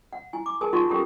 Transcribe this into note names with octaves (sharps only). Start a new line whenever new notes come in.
F#5
E4 G#5
D6
G#4 A#4 G#5 A5 D#6
D#4 F4 F#4 F#5 A5 C#6
C#4 G4 A4 A#4 F#5 A#5